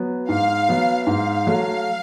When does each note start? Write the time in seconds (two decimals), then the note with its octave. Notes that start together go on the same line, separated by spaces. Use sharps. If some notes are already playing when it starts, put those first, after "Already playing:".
Already playing: F#3 B3
0.29 G#2 F5
0.69 F#3 B3
1.07 G#2 F5
1.47 F#3 A3